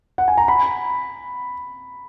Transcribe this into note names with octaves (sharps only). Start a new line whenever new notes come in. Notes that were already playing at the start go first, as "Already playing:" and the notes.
F#5
G#5
A#5
B5